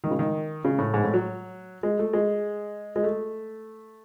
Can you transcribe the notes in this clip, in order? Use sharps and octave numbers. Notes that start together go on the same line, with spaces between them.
D#3
C#3
D#3
C#3
A2
G#2
A2
F#3
G#3
A3
G#3
G#3
A3